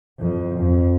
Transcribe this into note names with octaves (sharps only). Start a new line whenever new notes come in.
F2
F2